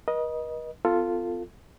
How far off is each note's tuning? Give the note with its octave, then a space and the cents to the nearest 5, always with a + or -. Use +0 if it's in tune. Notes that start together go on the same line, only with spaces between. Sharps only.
B4 -45 D#5 +0
C4 -45 F4 +0 A4 +15